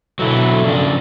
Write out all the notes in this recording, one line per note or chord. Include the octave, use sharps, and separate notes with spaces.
B2 D3 F#3 E4
C#3 F3 D4